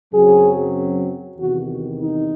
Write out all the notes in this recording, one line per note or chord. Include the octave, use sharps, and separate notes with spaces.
F#2 C#3 F#3 C4 G#4
E2 C3 D#3 F#4
D#4